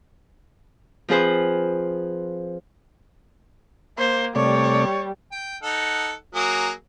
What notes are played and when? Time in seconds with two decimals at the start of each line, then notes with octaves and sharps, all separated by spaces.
1.08 F3 C4 F4 G#4 B4 C5
3.98 A#3 C5
4.35 C3 G3 A3 C#5 D5
5.32 G5
5.63 D#4 A4 F#5
6.35 F#3 A#3 G#4